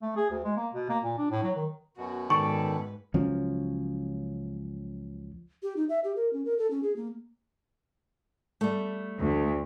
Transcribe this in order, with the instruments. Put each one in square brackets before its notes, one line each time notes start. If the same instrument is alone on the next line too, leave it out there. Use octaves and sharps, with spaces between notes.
[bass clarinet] A3
G#4
D2
G#3
A#3
B2
A#3
A#2
D4
A2
F#3
D#3
[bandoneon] F#2 B2 [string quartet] F#4
[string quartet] G#2 B4 [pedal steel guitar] D#3 A4 D5 [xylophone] C#6
[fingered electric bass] C#2 F3 F#3 C#4
[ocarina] G4
D#4
E5
G4
A#4
C#4
A#4
A4
C#4
G#4
A#3
[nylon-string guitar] G3 A3
[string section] D2